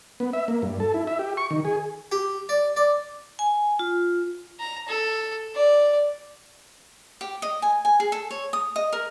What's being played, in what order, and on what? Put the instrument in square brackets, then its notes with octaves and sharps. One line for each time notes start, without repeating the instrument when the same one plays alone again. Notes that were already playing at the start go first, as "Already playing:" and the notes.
[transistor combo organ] B3
E5
A#3
G2
A4
E4
E5
G4
C#6
D#3
G#4
[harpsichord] G4
D5
D5
[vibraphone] G#5
F4
[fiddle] A#5
A4
D5
[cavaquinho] G4
D#5
G#5
G#5
G#4
A4
C#5
D#6
D#5
A#4